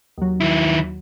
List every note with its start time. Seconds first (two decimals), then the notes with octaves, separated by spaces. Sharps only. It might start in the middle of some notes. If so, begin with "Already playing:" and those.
0.18 D#2 F#3
0.41 D#3 E4